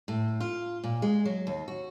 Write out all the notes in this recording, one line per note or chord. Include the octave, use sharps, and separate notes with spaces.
A2
F4
A#2
G#3
F#3
D#2
F#4